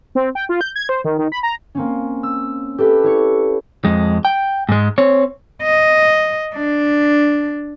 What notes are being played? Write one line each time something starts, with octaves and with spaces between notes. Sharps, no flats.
C4
G5
F4
G6
G#6
C5
D#3
D#3
B5
A#5
A#3 C4 C#4
E6
G4 A4 B4 E5
E4 C#5 C#7
F2 G#3
G5
G#2 G#3
C4 C#5
D#5
D4